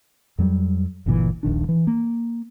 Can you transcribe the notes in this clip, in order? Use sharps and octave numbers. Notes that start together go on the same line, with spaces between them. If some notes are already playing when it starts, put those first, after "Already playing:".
F2 F#3 G3
G1 D2 A#2 E3
D#1 A#1 D#3 D4
E3
A#3